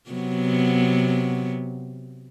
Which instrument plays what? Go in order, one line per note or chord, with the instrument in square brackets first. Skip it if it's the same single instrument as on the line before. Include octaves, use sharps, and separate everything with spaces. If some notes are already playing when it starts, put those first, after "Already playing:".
[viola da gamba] C3 F#3 B3